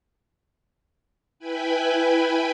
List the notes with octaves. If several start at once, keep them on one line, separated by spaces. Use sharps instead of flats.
E4 B4 G5 G#5 B5